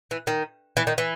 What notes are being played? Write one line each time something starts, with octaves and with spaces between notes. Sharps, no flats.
E3
D#3
E3
D#3
E3